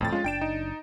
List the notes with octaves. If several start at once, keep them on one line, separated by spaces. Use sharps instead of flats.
D1 F2 A2 G5 A6
G#3 C#4 F4
F#1 D4 G5 D7 E7
D#4